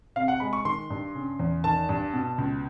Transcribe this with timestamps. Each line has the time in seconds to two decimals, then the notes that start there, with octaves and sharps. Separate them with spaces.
0.16 C3 F5
0.28 F#5
0.40 G#3 B5
0.53 C#6
0.65 D#3 C6
0.90 G2
1.15 C#3
1.39 E2
1.64 D#3 A5
1.89 G2
2.14 B2
2.38 C#2